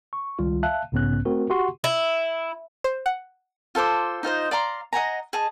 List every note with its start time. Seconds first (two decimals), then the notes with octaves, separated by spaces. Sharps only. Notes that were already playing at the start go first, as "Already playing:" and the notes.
0.13 C#6
0.39 C#2 D#3 G3 F4
0.63 E5 F5 A5 F#6
0.92 B1 G#2 C#3 B3 C#4 F#6
1.25 A3 C4 F#4 A#4
1.50 F#4 G4 F#5 C6 C#6
1.84 E4
2.84 C5
3.06 F#5
3.75 F4 A4 C5 D6
4.23 D#4 F4 C5 D#5
4.51 D5 F5 A#5 C6
4.93 D#5 F#5 G#5 A#5
5.33 G#4 D#5 A5